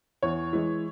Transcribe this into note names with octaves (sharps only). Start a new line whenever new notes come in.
E2 C#5
E3 G#3